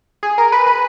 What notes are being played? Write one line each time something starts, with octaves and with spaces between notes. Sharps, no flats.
G#4
A#4
B4
B4